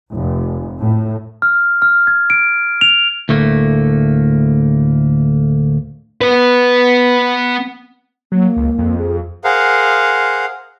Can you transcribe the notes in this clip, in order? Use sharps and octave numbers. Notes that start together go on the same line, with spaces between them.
F1
A2
F6
F6
G#6
D7
F7
D2 A2 A3 A#3
B3 B4
F#3 A#3
C#2
F2
G#4
G#4 A#4 C5 F5 F#5